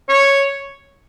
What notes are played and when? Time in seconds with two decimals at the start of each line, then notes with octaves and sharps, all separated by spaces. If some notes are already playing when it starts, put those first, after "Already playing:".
0.09 C#5